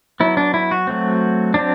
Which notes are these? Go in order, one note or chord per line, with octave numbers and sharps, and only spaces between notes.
F#3 B3 E4
D4
E4
F#4
F#3 A3 C4
F#3 C4 D4